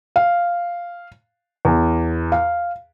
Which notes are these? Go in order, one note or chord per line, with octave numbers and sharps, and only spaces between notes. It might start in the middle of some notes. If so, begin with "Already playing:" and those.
F5
E2
F5